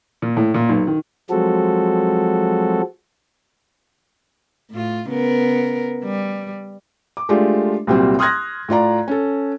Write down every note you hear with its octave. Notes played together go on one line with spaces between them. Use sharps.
A#2
A2
A#2
B1
D#3
F3 F#3 G#3 C4 F#4 A4
A2 F4
C#3 B3 A#4
G3
D6
G#3 A3 D4 F4 G4
C2 A#2 F#3 G3 C4
C6 D#6 F6 F#6 G#6 A#6
A2 F4 D5 A#5
C#4 A4